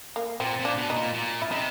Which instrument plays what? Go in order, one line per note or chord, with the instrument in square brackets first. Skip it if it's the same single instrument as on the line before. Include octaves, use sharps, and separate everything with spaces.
[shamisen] A#3
[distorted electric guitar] A#2 [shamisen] C4
[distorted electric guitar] A#2
[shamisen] D4
[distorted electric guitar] B2
[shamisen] D#4
[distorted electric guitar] A#2
A#2
[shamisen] E4
[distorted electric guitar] C3 [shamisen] D#4